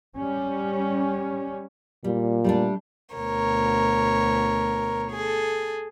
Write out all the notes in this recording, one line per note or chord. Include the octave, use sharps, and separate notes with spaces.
G3 C#4
A#2 G3
G3 A3 D4
D2 B2 A#4 C#5
G#4 A4